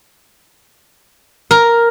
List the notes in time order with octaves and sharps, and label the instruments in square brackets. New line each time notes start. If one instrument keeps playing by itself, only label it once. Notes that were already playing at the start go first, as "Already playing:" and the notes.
[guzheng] A#4